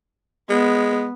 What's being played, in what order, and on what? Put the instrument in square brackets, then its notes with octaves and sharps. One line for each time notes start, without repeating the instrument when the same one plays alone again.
[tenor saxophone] G#3 [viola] B3